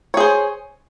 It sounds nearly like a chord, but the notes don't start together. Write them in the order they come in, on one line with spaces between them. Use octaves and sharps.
C#5 G#4 C5